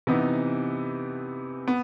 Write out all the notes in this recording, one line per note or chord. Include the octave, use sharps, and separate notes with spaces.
C3 E3 B3 D#4
B3